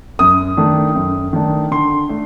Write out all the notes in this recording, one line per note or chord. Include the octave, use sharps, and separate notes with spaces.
F#2 D#6
D#3 A3 D4
F#2
D#3 A3 D4
D3 C6
A3 D4